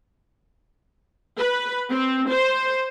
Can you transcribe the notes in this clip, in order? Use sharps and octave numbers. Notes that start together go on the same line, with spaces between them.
B4
C4
C5